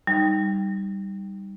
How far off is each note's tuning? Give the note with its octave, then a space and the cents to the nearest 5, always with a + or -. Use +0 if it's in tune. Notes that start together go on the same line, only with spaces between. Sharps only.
G3 +0 D#4 +0